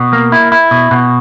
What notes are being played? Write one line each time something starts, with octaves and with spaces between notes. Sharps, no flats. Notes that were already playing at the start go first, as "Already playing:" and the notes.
Already playing: B2
A#3
E4
E4
B2
B2